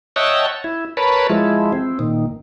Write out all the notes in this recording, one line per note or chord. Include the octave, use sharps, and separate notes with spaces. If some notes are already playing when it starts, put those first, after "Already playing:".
C#5 D#5 E5 F#5 G5 A5
E4
A#4 B4 C#5 A5 B5
F3 G#3 E4
C4
A#2 D#3